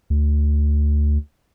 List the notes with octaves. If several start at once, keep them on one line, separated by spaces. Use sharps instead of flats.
D2